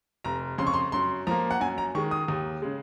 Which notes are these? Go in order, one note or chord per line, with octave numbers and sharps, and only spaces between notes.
F1 A#5
F2 C#3 C6
C#6
C6
F#2 C6
F3 A#3 A#5
F#5
F#2 G#5
A#5
D#3 G#3 C#6
D#6
D#2
C#3 G#3